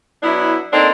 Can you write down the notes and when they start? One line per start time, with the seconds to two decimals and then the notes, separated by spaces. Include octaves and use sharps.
0.23 F#3 B3 D4 E4
0.73 A#3 C4 D4 D#4 A4